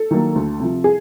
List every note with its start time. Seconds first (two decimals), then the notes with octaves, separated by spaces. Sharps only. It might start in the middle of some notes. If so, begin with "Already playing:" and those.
Already playing: A4
0.11 D#3 F#3 A#3
0.35 D2
0.60 C3 F3
0.84 G#4